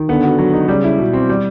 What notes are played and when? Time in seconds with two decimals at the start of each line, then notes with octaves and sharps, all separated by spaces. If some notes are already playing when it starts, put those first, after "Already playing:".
Already playing: D#3
0.09 D3 B3
0.23 F#4
0.38 F#3
0.53 D#4
0.68 C#3 G3
0.84 E4
0.98 B2
1.13 C4
1.29 G3